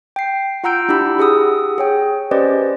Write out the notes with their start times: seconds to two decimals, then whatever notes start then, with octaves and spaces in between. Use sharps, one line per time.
0.16 G5 C7
0.64 F4 F#5 A#5 E6 G6 D7
0.88 D4 E4 G4 B5 E6
1.18 G4 G#4 F#5 D#6 E6
1.78 G#4 C#5 G5
2.31 C#4 G4 B4 C5 D5 D#5